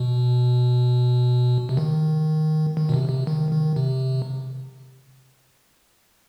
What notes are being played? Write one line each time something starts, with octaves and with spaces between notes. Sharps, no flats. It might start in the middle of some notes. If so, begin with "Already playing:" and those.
Already playing: B2
C3
D#3
D#3
B2
C3
C3
D#3
D#3
C3